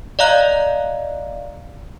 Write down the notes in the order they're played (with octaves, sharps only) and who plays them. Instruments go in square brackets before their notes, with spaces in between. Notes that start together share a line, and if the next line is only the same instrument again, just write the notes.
[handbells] D5 D#5 F5 A#5 F#6